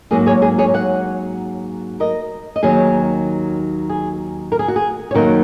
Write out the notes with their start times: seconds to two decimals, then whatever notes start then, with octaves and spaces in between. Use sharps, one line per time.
0.11 G#2 F#3 A#3 G#4
0.26 G#4 C#5
0.42 G#4
0.58 G#4 C#5
0.74 C#5 F#5
2.00 A#4 D#5
2.56 D#5
2.63 D#2 D#3 F#3 G#4 C#5
3.89 G#4
4.52 A#4
4.59 G#4
4.68 F#4
4.76 G#4
5.11 C#5
5.14 F#2 D#3 F#3 A#3 D#4 F#4 A#4